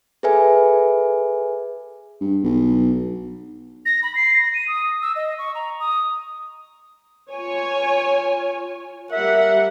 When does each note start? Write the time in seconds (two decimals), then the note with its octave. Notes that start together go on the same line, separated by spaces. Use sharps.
0.23 G#4 A4 B4 E5 G#5
2.21 G2
2.43 B1
3.86 A#6
4.03 B5
4.15 C7
4.34 A#6
4.54 D#7
4.68 D#6
5.02 E6
5.16 D#5
5.38 C#6
5.55 A#5
5.80 D#6
7.31 F4 C#5 G#5
9.12 G3 A#4 E5 F#5